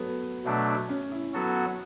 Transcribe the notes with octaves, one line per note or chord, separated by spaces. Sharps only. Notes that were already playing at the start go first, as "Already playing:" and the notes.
Already playing: F#3 A3 B3
B2 F#3 A3 D4
C#4
E4
F#3 B3 F#4 A4